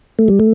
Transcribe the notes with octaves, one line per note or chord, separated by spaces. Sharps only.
A3
G3
A3